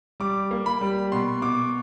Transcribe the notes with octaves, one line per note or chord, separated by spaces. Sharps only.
G3 D6
A#3
B5
G3
B2 C6
B2 D6